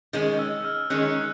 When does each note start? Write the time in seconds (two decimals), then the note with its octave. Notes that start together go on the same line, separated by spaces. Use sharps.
0.13 D#3 G#3 C#4
0.39 E6
0.65 F6
0.90 D#3 G#3 C#4 F#6